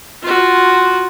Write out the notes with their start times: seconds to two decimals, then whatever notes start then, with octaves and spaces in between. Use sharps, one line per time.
0.22 F4 F#4